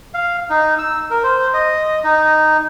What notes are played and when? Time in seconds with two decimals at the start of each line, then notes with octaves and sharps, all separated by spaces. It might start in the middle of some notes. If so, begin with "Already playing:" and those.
0.14 F5
0.50 D#4
0.79 E6
1.10 A#4
1.23 C5
1.54 D#5
2.04 D#4